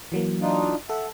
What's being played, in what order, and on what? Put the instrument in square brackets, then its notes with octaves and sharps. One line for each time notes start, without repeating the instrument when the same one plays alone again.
[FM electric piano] E3 F#3 A#3
[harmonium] D4 D#4 F4
[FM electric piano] A4 [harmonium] E5 F#5